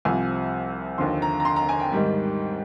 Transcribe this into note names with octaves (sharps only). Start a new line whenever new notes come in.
C2 C3 F3 G#5
D#2 D3 F3 C6
A#5
A#5
C6
A#5
G#5
G5
G#2 D#3 G3